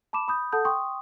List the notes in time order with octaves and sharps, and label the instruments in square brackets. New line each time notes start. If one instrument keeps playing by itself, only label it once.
[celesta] A5 B5 D6 E7
B5 D#6 G6
A4 F#5 A5 D#6 G6
G5 C6 C#6 D#6